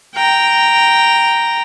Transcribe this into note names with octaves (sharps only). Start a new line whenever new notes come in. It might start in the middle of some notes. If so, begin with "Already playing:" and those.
G5 A#5